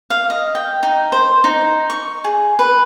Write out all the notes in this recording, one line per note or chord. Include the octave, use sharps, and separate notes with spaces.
F5
D#5
G5
D#4
C5
D#4
C#6
G#4
B4